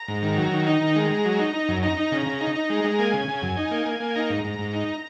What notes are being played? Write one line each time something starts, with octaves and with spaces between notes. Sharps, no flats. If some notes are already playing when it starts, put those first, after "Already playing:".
Already playing: A#5
G#2
D#3
F#3
D#3
D#4 A#5
D#3
G#3
G#3
F#3
D#4
D#4
F#2
D#4 A#5
D#4
C#3
C#3
D#4
D#4
G#3
G#3
A#3 G#5
C#3
C#3
F#2
D#4
A#3
A#3
A#3
D#4 A#5
G#2
G#2
G#2
D#4